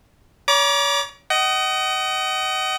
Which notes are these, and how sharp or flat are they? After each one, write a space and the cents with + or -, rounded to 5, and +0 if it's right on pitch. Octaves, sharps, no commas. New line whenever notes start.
C#5 +35 A#5 +40 D6 +0
D#5 +0 F#5 +40